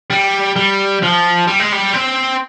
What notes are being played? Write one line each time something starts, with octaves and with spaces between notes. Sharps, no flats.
G3
G3
F3
G3
G#3
G3
C4